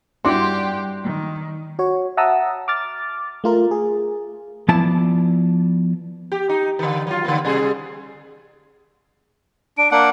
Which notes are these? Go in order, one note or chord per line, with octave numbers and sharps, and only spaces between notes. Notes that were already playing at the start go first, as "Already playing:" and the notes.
G2 D4 E4 F#4 G4 D5 G5 C6
D#3
F#4 C#5
E5 F#5 A5 A#5 D#6 E6
D6 F6 A6
A3 F4 A#4
G#4
F3 B3 E4 D5 A5
G4
D#4
D3 D#3
F#3 F4
D3 A#3
C3 G3 G#4
D4 D7
A#3 D4 F#5 D6